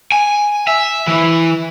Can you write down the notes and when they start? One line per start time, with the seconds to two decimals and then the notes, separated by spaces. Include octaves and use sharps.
0.12 G#5
0.67 E5
1.07 E3